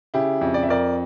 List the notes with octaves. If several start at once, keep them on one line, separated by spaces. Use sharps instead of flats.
C#3 E4 G4
F2
D5
E5
F2 A#4 D5